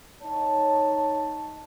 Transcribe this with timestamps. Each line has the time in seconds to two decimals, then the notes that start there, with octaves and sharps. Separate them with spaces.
0.23 D#4 C#5 A5